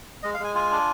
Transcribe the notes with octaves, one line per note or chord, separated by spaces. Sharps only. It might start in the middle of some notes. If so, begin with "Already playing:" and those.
G#3 D#5
F5
G#3 G#5
F4 G#5
D4